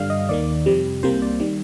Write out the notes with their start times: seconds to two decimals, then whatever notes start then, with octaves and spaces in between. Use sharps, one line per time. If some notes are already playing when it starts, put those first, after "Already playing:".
Already playing: G2 D3 G3 F5
0.10 D#5
0.29 D#2 D#3 A#3 D5
0.66 F2 C3 G3
1.03 C2 C3 G3 A#3 C5
1.22 D5
1.40 D#3 G3